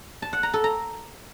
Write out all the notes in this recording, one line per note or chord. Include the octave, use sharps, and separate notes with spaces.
A5
F#5
A#5
A4
A#5